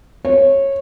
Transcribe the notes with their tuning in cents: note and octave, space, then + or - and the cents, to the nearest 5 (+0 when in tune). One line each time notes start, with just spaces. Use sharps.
C#5 -20